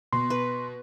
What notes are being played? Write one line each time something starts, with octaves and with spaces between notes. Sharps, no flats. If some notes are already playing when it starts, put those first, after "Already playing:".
B2 C6
B4